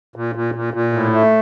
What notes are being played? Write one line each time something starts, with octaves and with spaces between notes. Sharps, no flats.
A#2
A#2
A#2
A#2
A2
A3